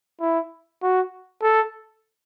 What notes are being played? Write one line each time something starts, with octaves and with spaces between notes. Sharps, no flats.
E4
F#4
A4